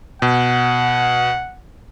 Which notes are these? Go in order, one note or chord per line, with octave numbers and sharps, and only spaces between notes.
B2 F#5